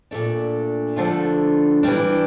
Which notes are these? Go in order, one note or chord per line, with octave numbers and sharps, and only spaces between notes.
A#2 A3 D4
D3 F3 A3 D4 F4
E3 G3 D4